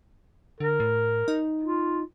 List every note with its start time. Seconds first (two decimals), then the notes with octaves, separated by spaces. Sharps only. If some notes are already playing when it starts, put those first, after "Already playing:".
0.60 D3 A#4
0.80 A2
1.28 D#4
1.63 F4